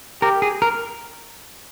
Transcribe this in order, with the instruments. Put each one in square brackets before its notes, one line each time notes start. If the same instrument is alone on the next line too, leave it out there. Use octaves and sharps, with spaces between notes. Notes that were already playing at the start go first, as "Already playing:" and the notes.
[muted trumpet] G4 [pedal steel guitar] A#4
[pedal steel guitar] G#4
A#4